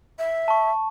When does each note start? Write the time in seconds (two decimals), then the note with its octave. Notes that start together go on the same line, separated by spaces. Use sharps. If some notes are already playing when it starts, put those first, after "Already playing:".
0.19 E5
0.48 A5 C#6